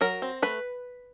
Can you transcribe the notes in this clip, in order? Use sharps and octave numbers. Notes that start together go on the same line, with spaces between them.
F#3 A#4
C4
A3 B4